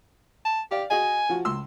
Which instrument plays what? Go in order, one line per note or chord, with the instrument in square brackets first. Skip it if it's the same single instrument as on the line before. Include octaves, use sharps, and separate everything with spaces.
[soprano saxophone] A5
[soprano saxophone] G4 [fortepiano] D5 F5
[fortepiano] F#4 G#4 D#5 [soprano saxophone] G#5
[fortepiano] F3 F#4
C#2 C6 E6